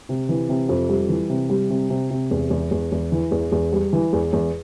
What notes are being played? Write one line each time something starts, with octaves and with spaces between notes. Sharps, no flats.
C3
E3
C3
F2
G3
E3
C3
G3
C3
C3
C3
E2
E2
E2
E2
E3
E2
E2
G3
E3
E2
E2